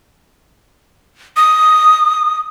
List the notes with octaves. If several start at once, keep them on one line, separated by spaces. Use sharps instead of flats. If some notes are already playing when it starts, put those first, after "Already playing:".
D#6